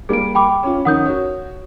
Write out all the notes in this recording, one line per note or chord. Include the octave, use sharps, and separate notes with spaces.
G3 A#3 G#4 D7
G5 B5 D6
C#4 F4
D#3 C#4 D#4 F#5 D#6 G6
F#4 C#5